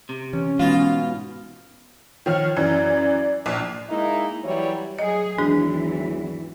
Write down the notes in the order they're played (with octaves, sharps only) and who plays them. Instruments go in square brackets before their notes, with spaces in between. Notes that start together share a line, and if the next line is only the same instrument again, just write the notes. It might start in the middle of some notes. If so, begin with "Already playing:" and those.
[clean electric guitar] C3
[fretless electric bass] E3 [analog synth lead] C#4
[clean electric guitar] G#2 B2 [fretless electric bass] E3 G#3 [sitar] F4
[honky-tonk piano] D#3 F3 F6 [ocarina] C#5
[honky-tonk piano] F#2 E3 [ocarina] D5
[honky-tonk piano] A#1
[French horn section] G#3 A#3 D#4 E4
E3 F#3 G3 E4 C#5
[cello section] F#3 G#4 [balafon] D#5
[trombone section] G#1 E2 F#3 [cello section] E3 [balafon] D4 G#4